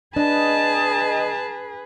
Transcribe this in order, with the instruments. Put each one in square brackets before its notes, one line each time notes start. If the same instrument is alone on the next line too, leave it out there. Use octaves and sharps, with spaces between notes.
[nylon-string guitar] D4 [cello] G#4 B4 [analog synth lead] D#5 [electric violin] A5